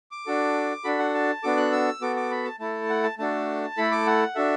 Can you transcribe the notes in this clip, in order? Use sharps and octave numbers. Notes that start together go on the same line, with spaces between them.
D6
D4 F#4 A4
D4 F#4 A4 B5
F#5
A5
B3 D4 F#4 A4 D6
F#6
E6
B3 F#4 A4 D6
D6
B5
A5
A3 E4 A4 A5
F#5
A5
A3 D4 F#4 A4 A5
A3 E4 A4 B5
D6
F#5
D4 F#4 A4 E5